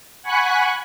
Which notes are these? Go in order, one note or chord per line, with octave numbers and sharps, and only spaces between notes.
F#5 G#5 B5 C#6 F#6